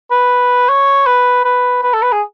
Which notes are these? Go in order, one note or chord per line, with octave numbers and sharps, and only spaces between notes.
B4
C#5
B4
B4
B4
A4
B4
G#4